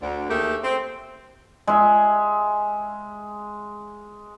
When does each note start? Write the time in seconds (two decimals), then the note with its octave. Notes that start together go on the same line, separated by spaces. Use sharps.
0.01 D2 D3
0.29 D#2 A3 A#3 G4 G#4 E5
0.64 C4
1.67 G#3 E5